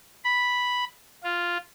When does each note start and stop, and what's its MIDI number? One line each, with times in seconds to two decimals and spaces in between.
0.25 0.85 83
1.24 1.58 65